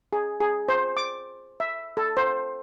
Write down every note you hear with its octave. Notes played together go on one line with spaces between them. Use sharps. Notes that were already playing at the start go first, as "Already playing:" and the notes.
G#4
G#4
C5
D6
E5
A4
C5